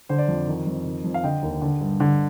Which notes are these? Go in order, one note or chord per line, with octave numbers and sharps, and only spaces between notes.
D3 C5
D5
F2
D#3
F2
D#3
F2
F5
D3 D#5 G5
D#2
D3
G2
D3